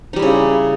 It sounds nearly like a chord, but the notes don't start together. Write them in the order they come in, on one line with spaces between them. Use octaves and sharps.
D#4 G3 E4 C#3